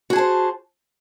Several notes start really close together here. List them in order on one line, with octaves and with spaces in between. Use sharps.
F#4 G#4 A5 C5